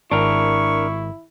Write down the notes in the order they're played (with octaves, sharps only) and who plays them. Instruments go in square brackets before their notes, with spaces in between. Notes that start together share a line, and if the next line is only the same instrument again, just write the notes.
[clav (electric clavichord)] G#1 [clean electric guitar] D4 A#4 [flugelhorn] E4 [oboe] C#6